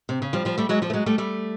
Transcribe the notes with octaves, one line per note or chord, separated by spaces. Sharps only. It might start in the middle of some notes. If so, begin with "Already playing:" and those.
C3
C#3
F3 G3
F3 G3
G3 A3
F#3 G#3
F3 G3
A3
F#3 G#3
G3 A3
G3 A3